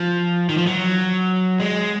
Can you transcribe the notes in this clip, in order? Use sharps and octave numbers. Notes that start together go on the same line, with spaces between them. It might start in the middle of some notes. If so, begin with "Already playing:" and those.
Already playing: F3
D#3
F3
F#3
G#3